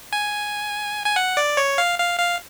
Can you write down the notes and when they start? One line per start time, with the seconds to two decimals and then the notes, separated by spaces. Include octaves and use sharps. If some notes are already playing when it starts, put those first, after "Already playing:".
0.13 G#5
1.06 G#5
1.16 F#5
1.37 D5
1.57 C#5
1.78 F5
1.99 F5
2.19 F5